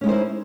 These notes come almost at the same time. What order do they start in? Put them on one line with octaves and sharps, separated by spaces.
C#4 G#3 D#4 C5 E4